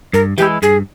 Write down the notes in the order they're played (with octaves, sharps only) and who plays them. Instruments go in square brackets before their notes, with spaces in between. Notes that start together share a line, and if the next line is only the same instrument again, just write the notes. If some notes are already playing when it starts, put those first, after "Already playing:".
[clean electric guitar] G2 [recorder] A#4
[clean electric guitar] E3 G#3 E4 [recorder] G4
[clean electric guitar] G2 [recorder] G#4